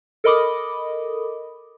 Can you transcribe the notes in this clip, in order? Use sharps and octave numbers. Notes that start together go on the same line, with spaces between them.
A4 A#4 D#5 B5 D6 D#6